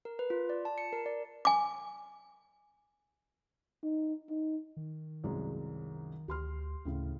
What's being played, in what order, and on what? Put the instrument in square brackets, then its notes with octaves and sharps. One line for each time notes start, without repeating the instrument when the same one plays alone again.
[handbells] A#4
B4
F4
D5
A5
C#7
A#4
D5
[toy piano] G#5 D6
[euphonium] D#4
D#4
[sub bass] D#3
[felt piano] C2 F#2 G#3
[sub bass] D2 [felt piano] G4 C6 F6
[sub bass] D2 [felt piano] A2 C#3